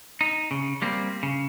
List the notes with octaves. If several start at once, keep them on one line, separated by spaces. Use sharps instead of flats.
D#4
C#3
G3 A#3 C4
C#3